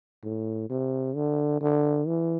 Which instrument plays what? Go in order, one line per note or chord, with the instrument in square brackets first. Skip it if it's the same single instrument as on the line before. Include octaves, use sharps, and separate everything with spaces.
[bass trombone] A2
C3
D3
D3
E3